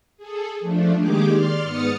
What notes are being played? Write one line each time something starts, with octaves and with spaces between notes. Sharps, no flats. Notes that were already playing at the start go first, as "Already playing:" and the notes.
G#4 A4
F3 A3 D4
D#3 G#3 A#3 G4 G#4 D6
D5 C6 F6
G#2 B3 D#6 F6 A6 C#7